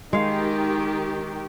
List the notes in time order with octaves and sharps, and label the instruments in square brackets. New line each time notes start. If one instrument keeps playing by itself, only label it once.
[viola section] D#3 G4 [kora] G#3 F5